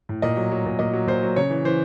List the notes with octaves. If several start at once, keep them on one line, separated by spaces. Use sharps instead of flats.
A2
A#2 D#5
F#3
F#3
A#2
A#2 D#5
F#3
A#2 C5
F#3
C#3 C#5
E3
E3 C5